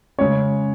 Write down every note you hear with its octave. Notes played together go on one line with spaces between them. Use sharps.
C#3 G#3 C#4 C#5